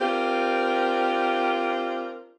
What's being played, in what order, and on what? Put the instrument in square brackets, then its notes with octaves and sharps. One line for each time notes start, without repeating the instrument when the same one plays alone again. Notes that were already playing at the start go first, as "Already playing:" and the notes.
[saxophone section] C4 D4 F4 G4 A#4